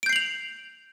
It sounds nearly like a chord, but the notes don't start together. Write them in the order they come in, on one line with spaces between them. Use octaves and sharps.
D7 G6 C7 F#7 F7